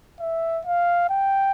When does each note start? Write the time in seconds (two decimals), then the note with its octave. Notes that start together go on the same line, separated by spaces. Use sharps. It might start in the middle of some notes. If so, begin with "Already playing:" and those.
0.20 E5
0.65 F5
1.10 G5